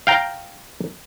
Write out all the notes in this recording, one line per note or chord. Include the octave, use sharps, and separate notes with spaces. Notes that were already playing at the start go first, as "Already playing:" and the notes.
F5 G5 A#5